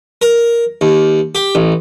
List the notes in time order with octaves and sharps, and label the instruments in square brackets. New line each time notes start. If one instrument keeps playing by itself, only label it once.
[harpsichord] A#4
D#2
G4
A1